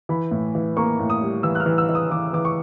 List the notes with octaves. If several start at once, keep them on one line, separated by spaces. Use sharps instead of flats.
E3 B5
A2
E3
A#3 C#6
A2
D#6
G3
E3 E6
F#6
F6
E3
E6
E3
D#6
E3 D6
E3 D6
C#6